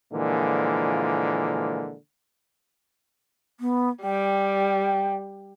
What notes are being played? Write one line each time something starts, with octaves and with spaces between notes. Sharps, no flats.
A#2 D3 E3 F3 G#3 A#3
B3
G3 G5